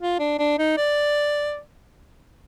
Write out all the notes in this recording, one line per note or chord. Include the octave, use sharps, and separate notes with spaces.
F4
D4
D4
D#4
D5